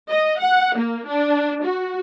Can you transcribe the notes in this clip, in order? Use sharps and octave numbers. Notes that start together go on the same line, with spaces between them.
D#5
F#5
A#3
D4
F#4